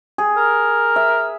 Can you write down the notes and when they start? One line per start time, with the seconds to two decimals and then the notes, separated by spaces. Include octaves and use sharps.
0.18 G#4
0.37 A#4
0.96 E5